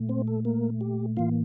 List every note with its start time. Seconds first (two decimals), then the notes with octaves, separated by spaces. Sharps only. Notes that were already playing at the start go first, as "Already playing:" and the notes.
Already playing: A#2 A3
0.09 C4 C5
0.28 A4
0.45 A#3 A#4
0.81 G4
1.17 A2 E3 A#3 F4 F5